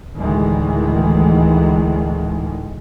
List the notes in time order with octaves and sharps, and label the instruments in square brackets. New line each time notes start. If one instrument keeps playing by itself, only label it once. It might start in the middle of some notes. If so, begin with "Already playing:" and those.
[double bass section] D2 A2 D#3 E3 G#3